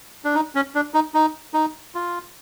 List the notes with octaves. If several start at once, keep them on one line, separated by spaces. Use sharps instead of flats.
D4
D#4
C#4
D4
D#4
D#4
D#4
F4